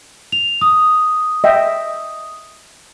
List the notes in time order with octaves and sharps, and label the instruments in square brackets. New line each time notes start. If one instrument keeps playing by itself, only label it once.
[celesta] F7
D#6
[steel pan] D#5 E5 G5